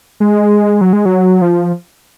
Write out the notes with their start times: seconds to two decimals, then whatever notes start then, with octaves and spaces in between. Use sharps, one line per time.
0.20 G#3
0.81 F#3
0.93 G#3
1.06 F#3
1.42 F3